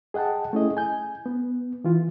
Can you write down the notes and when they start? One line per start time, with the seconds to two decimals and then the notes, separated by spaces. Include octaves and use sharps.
0.14 G#4 D#5 F#5 G5 A5
0.53 A3 C#4 E4 G#4 D#5
0.77 G#5 G6
1.26 B3
1.84 E3 F4